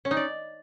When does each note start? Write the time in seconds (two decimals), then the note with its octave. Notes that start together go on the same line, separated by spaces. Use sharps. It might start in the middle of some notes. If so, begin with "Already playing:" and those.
0.05 C#4
0.11 D#4
0.17 D5